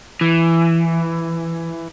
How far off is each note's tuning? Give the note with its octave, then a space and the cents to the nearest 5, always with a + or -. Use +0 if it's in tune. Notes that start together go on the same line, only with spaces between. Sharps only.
E3 +10